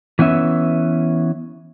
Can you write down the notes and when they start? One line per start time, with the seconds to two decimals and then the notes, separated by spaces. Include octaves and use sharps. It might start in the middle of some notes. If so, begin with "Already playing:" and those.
0.19 E3 B3 C#4 E5